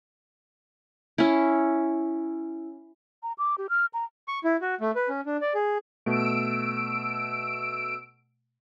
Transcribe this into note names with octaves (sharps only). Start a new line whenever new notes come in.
C#4 E4
A#5
D6
G4
F6
A#5
C#6
E4
F#4
A3
B4
C#4
D4
D5
G#4
B2 A3 E6 D7